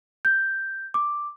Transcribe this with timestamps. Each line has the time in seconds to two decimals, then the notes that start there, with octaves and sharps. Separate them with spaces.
0.25 G6
0.94 D6